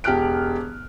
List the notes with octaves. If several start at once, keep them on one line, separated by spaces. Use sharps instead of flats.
E1 G4 A5 F6 F#6 D7